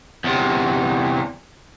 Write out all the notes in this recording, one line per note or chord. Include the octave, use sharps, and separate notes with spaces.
E2 C3